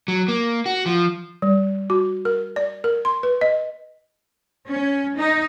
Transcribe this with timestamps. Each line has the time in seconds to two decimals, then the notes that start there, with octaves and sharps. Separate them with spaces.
0.08 F#3
0.28 A#3
0.66 F#4
0.86 F3
1.42 G3
1.90 F#4
2.25 A#4
2.56 D5
2.84 A#4
3.05 C6
3.23 B4
3.41 D#5
4.68 C#4
5.16 D#4